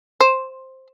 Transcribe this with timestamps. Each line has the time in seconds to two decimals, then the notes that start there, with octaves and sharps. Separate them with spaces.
0.21 C5